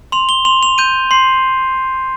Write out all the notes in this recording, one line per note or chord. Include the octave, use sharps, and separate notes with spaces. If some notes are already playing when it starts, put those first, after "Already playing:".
C6 F7
G7
C6 F7
F7
G6 D#7
C6 C7